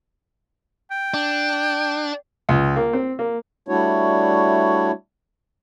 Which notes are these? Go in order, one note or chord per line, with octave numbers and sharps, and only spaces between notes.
G5
D4
C#2
A#3
C4
A#3
G3 A3 D4 E4 F#4 C#5